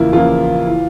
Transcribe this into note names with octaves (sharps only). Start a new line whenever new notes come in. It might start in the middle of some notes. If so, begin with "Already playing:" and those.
Already playing: E2 C#3 F3 A#3 E4 F4
E2 C#3 F3 A#3 F4
E3